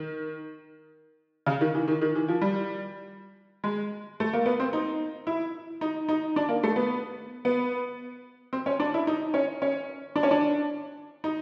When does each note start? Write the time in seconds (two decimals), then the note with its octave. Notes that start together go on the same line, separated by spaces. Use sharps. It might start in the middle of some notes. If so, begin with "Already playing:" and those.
Already playing: D#3
1.46 C#3
1.61 D#3
1.75 E3
1.88 D#3
2.02 D#3
2.15 E3
2.28 F3
2.41 G3
3.64 G#3
4.20 A3
4.33 A#3
4.46 B3
4.60 C4
4.73 D#4
5.27 E4
5.81 D#4
6.09 D#4
6.36 D4
6.49 A#3
6.63 A3
6.76 B3
7.45 B3
8.53 C4
8.66 C#4
8.80 D4
8.94 E4
9.07 D#4
9.34 C#4
9.62 C#4
10.16 D4
10.23 C#4
10.31 D4
11.24 D#4